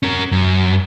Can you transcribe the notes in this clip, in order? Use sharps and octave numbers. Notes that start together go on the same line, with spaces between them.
C#4 A#4
F#2